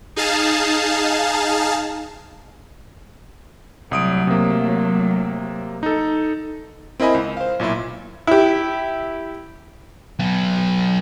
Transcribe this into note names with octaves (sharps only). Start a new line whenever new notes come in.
D#4 G#4 F5 A5
C2 F#3 A3 D#6 D7
C3 A#3
D#4 A4
C4 E4 A#4 D#5 G#5 B5
C#2
C5 F5
B1 A#2 E4 E5
E4 G4
F#3 B3